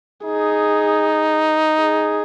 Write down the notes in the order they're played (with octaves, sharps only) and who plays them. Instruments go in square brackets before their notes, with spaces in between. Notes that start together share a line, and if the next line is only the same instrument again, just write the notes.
[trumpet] D#4 [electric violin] G#4
[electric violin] G#4